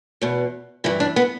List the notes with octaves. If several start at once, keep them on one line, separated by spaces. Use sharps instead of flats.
E2 B2
G2 E3 E4
D4
B3